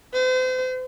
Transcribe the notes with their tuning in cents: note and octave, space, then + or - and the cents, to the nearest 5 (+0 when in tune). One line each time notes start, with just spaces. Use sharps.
C5 -40